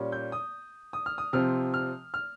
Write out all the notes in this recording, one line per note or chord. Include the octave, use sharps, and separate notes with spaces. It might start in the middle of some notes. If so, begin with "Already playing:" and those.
Already playing: A#2 G3 C#4
G6
D#6
D#6
F6
D#6
C3 F3 C4 F6
F6
F6